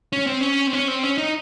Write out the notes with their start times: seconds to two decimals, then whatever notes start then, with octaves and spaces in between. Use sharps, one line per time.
0.13 C#4
0.27 C4
0.41 C#4
0.67 C4
0.73 C#4
0.88 C4
1.03 C#4
1.18 D#4